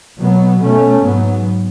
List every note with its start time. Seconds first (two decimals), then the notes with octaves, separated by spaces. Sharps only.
0.20 B2 F#3 B3
0.61 B2 A3 C#4
1.01 G#2 F#3 B3